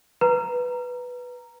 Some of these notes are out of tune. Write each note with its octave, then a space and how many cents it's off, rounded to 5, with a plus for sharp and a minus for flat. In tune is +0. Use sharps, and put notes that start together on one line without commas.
B4 +0 A#5 +0